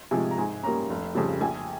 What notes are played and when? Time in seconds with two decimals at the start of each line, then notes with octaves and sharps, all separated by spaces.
0.11 C3 F3 G#3 G#5
0.31 A#5
0.38 G#2 G#5
0.63 G3 A#3 C#4 A#5
0.90 F1
1.15 F2 C#3 G3
1.41 A#1 G#5